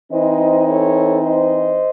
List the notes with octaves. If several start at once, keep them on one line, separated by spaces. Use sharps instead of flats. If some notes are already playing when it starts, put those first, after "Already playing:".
E3 C4 D#4 C5 D#5
A4 C#5
C5 D#5